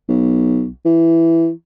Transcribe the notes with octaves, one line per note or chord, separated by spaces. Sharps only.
B1
E3